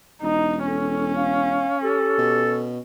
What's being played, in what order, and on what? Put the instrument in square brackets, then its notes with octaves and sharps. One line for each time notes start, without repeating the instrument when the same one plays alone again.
[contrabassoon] E1 [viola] D#4
[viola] C#4 [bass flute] A4
[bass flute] F5
[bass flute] G4 [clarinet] A4
[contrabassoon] B2